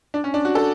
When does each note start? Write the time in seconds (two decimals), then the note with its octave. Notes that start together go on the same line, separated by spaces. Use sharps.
0.14 D4
0.24 C#4
0.34 D4
0.45 F#4
0.55 A4